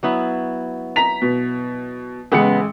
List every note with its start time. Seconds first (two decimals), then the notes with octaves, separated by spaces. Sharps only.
0.03 F#3 B3 E4
0.96 A#5 B6 F7
1.22 B2
2.32 A1 C#3 G#3 B3 C#7